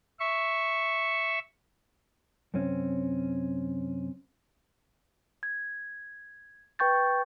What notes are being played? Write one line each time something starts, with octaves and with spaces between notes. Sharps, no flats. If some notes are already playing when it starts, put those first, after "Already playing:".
E5 C#6
F#2 C3 C4 C#4
G#6
B4 G5 C#6 G6 A6